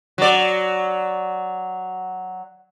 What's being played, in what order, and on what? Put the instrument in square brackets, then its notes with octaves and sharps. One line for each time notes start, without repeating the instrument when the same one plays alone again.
[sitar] F#3 D5